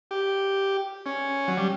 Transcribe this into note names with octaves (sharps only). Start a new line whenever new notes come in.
G4
C#4
F#3
G3